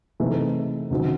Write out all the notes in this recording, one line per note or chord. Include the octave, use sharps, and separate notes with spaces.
C3 E3 A3 D#4 G#4
C#2 C3 D#3 F#3 C4